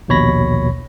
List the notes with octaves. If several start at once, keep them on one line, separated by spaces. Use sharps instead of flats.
A#1 D#2 B2 C#5 B5 A#6